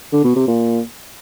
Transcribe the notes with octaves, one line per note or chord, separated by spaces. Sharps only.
D3
B2
C3
A#2